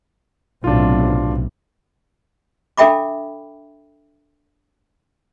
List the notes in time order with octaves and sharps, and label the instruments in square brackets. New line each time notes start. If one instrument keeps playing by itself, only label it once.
[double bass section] B1 A2 C3 [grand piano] D4 F4
[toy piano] D4 A4 E5 G5 B5 D6